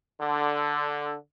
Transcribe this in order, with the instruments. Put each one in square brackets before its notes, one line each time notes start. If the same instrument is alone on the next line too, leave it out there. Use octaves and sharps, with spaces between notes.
[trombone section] D3